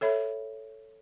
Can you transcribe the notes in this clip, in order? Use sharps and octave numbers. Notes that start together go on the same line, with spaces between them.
A4 C#5 E5 B5